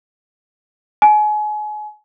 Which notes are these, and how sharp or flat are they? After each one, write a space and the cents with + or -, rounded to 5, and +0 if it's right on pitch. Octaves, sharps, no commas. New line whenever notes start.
G#5 +35